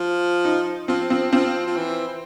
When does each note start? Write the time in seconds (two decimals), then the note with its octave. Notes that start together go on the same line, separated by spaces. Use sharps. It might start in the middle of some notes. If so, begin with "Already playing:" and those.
Already playing: F3
0.45 D#4
0.88 F3 C4
1.10 F3 C4
1.32 F3 C4
1.67 F3
1.77 E3
2.08 E3